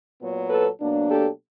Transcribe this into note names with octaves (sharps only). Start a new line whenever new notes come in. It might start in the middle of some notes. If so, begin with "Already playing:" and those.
A#2 F#3 B3
A4 B4
B2 F#3 A#3 D4
G4 A4